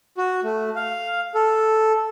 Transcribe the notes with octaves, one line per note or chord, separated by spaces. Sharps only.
F#4
A3
F5
A4